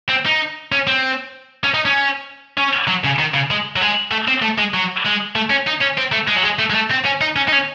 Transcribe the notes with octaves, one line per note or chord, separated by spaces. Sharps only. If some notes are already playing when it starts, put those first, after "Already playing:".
C4
D#4
C#4
C4
C#4
D#4
C#4
C#4
F#3
C#3
D#3
C#3
G#3
F#3
G#3
A3
C4
A3
G#3
F#3
G#3
A3
C#4
D#4
C#4
C4
A3
G#3
F#3
G#3
A3
G#3
A3
C4
C#4
D#4
C#4
D#4
C#4